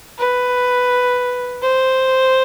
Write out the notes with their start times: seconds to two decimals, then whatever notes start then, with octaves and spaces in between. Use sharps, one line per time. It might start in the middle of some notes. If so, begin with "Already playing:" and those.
0.18 B4
1.62 C5